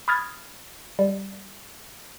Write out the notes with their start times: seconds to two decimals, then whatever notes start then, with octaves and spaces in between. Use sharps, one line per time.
0.08 B5 D#6 F6 G#6 A6
0.99 G3